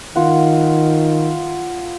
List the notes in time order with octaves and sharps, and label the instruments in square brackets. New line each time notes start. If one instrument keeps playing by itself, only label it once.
[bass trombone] D#3 [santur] F4 F#5